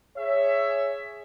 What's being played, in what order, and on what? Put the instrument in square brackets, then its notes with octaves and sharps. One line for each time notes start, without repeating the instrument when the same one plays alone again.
[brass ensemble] G#4 C#5 E5